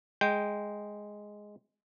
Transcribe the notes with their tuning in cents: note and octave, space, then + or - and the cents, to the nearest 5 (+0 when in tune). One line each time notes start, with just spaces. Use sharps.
G#3 +0 G5 +0